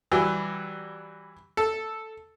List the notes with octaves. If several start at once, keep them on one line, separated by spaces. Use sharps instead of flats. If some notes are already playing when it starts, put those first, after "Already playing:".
E3 F#3 G3
A4